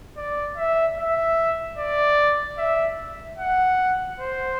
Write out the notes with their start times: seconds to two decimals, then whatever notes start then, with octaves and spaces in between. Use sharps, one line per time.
0.17 D5
0.57 E5
0.97 E5
1.78 D5
2.58 E5
3.38 F#5
4.19 C5